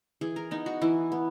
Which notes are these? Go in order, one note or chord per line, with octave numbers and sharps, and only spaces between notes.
E3 G#4
A#4
B3 D#4
F#4
E3 E4
B3